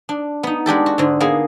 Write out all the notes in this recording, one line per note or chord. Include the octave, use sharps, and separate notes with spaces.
D4
B3 D#4
G#3 D4 G4 A4
F#4
G#2 D3
A#3 B3 G#4